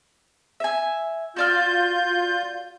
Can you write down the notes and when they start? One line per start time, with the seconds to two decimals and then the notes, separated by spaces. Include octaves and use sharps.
0.60 E5 G#5
1.36 F4 F#4 D5 F6 G6